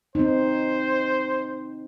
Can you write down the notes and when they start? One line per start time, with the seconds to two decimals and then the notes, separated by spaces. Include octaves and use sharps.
0.15 C4 D#4 C5